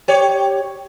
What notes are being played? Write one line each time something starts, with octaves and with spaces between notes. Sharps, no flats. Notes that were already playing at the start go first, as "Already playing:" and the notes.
G4 C#5